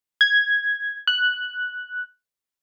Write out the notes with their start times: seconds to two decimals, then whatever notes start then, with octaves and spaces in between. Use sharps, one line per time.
0.21 G#6
1.07 F#6